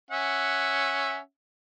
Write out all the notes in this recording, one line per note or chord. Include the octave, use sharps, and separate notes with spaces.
C#4 E5 F#5